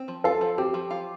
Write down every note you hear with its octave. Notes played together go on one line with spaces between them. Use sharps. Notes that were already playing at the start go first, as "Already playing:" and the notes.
Already playing: C4
F3
F4 A4
F3
C4 G4
F3
F4